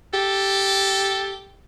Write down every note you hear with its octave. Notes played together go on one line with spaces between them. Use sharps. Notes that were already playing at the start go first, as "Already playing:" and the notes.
G4 A4